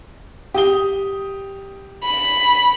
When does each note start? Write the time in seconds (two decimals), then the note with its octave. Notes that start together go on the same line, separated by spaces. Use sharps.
0.54 G4 D#6 G7
2.03 B5